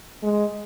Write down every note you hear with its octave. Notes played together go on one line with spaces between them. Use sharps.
G#3